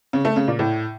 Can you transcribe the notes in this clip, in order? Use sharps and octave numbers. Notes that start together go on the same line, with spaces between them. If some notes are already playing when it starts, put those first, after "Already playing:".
C#3
A3
C#3
A#2
A2